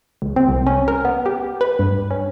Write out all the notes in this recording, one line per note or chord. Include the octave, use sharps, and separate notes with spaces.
C#2
C4
C2
C#4
A#4
B3
G4
B4
G2
C#4